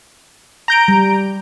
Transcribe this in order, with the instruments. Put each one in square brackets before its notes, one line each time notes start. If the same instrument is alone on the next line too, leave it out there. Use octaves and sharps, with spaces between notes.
[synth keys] A#5 G6 D7
[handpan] G3